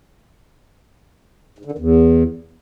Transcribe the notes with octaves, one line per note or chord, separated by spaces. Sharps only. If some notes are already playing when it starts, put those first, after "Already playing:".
G#2
D3
D#3
E2